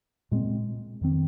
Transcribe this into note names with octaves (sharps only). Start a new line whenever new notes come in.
A#2 G#3 C4
F2 D#3 C4